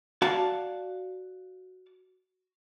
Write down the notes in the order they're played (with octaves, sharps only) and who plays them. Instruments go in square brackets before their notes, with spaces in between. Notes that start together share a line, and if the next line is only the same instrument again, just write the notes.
[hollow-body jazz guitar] F#4 D5 F5 A5